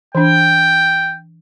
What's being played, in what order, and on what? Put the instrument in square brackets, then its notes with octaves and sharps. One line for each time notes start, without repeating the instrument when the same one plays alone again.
[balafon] E3 D4 [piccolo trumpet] G5